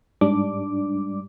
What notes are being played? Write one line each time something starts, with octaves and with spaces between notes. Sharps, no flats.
G#2 G3 D4 D6